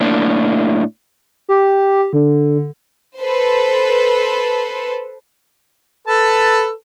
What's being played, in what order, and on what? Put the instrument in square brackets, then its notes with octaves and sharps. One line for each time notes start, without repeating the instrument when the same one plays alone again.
[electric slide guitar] A2 A#3 D4
[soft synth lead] G4
D3
[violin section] A4 B4 C5
[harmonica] A4 B4 A5